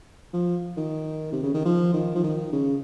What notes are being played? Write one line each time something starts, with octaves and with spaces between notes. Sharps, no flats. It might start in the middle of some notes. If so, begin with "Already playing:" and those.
F3
D#3
C3
C#3
D#3
F3
D#3
F3
D#3
C#3